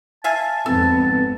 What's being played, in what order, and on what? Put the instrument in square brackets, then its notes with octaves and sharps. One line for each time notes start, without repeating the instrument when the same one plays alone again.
[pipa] E5 F5 G#5 [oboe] A5
[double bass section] G#1 F2 B3 [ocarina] C4 [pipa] A4